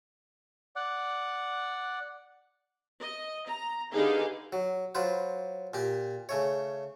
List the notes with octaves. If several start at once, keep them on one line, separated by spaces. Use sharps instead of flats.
D5 F#5
D#5
A#5
D3 D#4 G4 G#4 B4 F5
F#3
F#3 F4 B4 C5
A#2 G4
C#3 A3 C#5